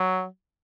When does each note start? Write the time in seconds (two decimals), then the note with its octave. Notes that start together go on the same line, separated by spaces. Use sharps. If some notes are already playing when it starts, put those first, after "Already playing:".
Already playing: F#3